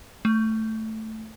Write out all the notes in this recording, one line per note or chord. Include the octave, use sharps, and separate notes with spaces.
A3